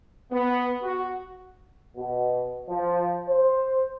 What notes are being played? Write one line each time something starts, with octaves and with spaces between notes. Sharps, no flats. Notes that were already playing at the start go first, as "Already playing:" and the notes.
B3
F#4
B2
F3
C5